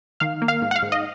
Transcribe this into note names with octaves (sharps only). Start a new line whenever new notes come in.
D#3 F5
A#3
F5
G#2
F#5
F5
G#2
D#5